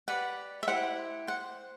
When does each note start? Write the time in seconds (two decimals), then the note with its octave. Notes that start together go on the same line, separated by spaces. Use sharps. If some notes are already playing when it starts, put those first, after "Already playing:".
0.08 G4 B4 D5 F#5
0.63 E5
0.68 E4 G4 C5 F#5
1.27 C5 F#5